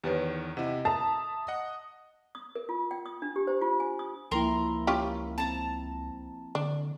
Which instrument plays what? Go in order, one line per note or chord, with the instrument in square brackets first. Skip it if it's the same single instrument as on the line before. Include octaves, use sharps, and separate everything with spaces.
[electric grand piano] E2 D#3 [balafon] G4 B4 C#5
[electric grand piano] C3 E4 [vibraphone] D#5 [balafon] F#5
[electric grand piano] E5 A#5 [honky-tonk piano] A5 [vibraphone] D#6
[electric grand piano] D#5 F#5
[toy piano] D#6
A#4
F4
G5
D#6
D4
G4
C5
F4
G#5
D#6
[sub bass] C#2 [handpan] F3 A#3 E4 [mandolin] A#4 A#5 C6
[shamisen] C#4 F4 G4
[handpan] C4 [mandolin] A5 A#5
[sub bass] D3 [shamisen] D4